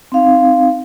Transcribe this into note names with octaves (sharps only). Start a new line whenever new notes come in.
C4 D#4 F5